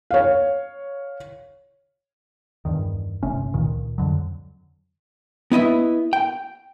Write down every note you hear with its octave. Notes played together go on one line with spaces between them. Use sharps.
C#5 F5
E2 G2 D#3
G1 C3 A3 C#4
C#2 A#2 D#3
F2 D3 F#3
B3 E4 D#5 E5
G5